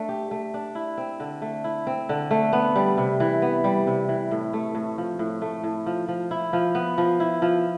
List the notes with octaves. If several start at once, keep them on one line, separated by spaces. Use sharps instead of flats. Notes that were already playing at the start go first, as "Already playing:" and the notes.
Already playing: A3 D4
G4
A3
D4
E4
C4
D3
A3
E4
C4
D3
A3
B3
G3
C3
E3
B3
G3
C3
E3
A2
A3
A2
F3
A2
A3
A2
F3
F3
E4
F3
B3
F3
E4
F3